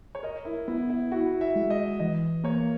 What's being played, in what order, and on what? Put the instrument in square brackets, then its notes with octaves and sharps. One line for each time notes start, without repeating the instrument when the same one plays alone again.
[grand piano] C#5
[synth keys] A#4 [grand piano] D#5
[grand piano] E4
[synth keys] B3 [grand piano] E4
[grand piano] E4
[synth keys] E4 [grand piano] F#4
[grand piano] E5
[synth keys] G#3
[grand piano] D#5
[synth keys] E3 [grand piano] D#5
[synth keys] A#3 [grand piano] C#5